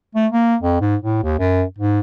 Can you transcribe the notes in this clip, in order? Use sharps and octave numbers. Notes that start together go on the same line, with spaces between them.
A3
A#3
F2
G#2
A2
D#2
F#2
G#2